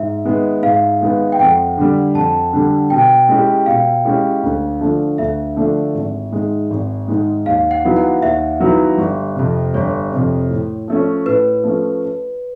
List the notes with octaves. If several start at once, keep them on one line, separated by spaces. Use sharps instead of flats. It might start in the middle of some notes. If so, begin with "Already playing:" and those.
Already playing: G#2 E5
D#3 G#3 B3
G#2 F5
D#3 G#3 B3
G5
F2 F#5
D3 G3
F2 A5
D3 G3
B2 G5
G#3 C#4 E4 G4
B2 F5
G#3 C#4 E4 G4
D2
D3 F3 A3 D4
D2 E5
D3 F3 A3 D4
G#1
G#2 D#3 G#3
G#1
G#2 D#3 G#3
D#2 F5
F#5
D#3 F#3 B3 E4
F#5
D#2 E5
D#3 F#3 B3 E4
G1
F2 C3
G1 C#5
F2 C3
A2
F3 A3 C#4
A2 B4
F3 A3 C#4